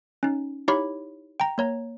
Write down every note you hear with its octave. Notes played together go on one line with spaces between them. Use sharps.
C#4 D#4
D#4 E4 G4 C#5 B5 C#6
G5 A#5
A#3 C#5 A#5